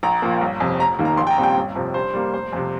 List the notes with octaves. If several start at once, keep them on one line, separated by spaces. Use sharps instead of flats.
A#1 A#5
A#2 F3 A#3
G1
F2 C3
F1 A#5
D#2 D#3 A#3
A#5
A#1 C6
G5
A#5
A#2 G3 C4
G5
G1
F2 C3 F3
G2 C5
G3 A#3
F1 C5
F2 C3